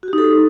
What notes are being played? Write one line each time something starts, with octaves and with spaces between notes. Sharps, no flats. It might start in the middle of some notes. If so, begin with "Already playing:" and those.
D#4 F#4 G4 A4